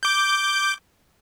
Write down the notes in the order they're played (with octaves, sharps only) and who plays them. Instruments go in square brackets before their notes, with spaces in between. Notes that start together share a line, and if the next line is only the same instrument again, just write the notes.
[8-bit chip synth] D6 G6